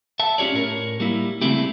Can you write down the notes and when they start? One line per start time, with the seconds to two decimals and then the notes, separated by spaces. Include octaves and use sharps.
0.20 E5 A5
0.38 C#4 F4 G4 C#5 D5
0.54 A2 A#4 C#5
1.00 G3 A#3 E4
1.41 C#3 G3 A3 C4 E4 G4